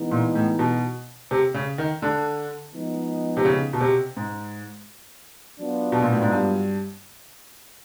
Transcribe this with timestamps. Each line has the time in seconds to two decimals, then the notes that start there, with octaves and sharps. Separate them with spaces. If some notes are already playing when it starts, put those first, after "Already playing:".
Already playing: E3 G#3 B3 D#4
0.11 A#2
0.35 A2
0.59 B2
1.31 C3
1.54 C#3
1.78 D#3
2.02 D3
2.73 F3 G#3 B3 D#4
3.37 C3
3.45 C#3
3.73 B2
3.81 C3
4.17 G#2
5.60 F#3 B3 D4 F4
5.92 B2
6.02 A#2
6.12 A2
6.22 G#2
6.31 G2